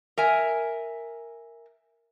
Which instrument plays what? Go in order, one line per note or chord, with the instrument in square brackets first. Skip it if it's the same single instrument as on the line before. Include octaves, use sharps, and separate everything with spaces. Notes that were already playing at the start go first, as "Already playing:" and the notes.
[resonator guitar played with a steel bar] A#4 E5 G#5